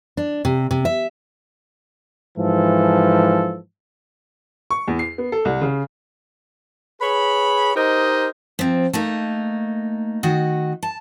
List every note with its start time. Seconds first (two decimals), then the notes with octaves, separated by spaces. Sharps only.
0.17 D4
0.45 C3
0.71 C3
0.85 E5
2.37 G#2 E3 F3 A4
4.70 C#6
4.88 E2
4.99 C7
5.18 B3
5.32 A4
5.45 C2
5.61 C#3
7.01 G#4 B4 C#5 B5
7.76 D#4 G4 A#4 C5 D#5
8.59 F3 C4
8.93 A3 A#3 D#4
10.23 D#3 F#4 D#5
10.83 A5